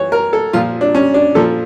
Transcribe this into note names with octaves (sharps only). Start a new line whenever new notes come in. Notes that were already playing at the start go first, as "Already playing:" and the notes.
Already playing: E3 C#5
A#4
A4
A#2 F3 F4
D4
C#4
D4
A#2 F3 A4